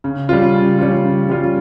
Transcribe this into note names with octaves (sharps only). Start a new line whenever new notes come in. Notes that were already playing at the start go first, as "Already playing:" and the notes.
C#3
G3 C#4 F4
C#3
G3 C#4 F4
C#3
G3 C#4 F4